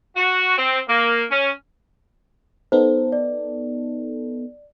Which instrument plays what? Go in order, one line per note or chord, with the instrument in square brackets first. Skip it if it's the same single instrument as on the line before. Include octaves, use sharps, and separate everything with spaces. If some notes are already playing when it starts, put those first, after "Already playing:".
[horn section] F#4
C4
A#3
C#4
[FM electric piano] B3 D#4 A4 [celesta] C5
[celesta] D5